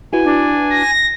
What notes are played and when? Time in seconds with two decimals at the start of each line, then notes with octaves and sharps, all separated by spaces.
0.13 E4 F#4 B4 G#5
0.24 D4
0.70 A#6